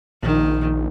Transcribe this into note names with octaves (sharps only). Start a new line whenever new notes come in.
A#1 D#3